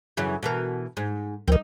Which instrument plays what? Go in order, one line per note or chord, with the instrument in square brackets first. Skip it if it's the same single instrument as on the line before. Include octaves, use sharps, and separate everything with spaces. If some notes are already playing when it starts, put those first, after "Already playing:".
[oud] F#2 C#3 E3
B2 E3 A#4
G#2
[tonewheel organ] D2 F3 A#4 [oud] C4 D#4